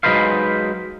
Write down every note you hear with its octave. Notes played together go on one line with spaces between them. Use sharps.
F#3 G#3 D#4 B4 C5 F5